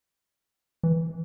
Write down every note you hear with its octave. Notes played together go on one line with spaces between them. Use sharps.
E3